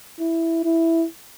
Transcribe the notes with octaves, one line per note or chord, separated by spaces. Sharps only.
E4
E4